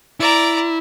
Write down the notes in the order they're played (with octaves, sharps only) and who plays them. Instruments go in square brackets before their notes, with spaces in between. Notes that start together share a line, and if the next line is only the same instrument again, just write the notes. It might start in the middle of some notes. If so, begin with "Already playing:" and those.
[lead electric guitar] E4 [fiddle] D5 A#5